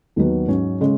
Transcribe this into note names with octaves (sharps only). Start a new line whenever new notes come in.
D#2 D#3 F#3 B3
G#2 F#3 C#4
C#3 G#3 C#4